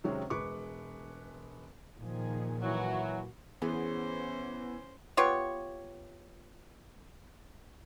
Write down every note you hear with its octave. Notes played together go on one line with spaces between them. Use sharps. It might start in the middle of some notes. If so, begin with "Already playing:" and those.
C3 D#3 F#3 G#3 C4 C#4
E1 G#3 B4 C#6 D6
A#2 D#3 F3 G#4
E3 F#3 F#4
E3 B3 C#4 G#4 C5
B3 F4 G4 C#5